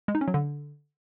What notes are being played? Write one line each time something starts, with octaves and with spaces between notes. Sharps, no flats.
G#3
D#4
C#4
F#3
D3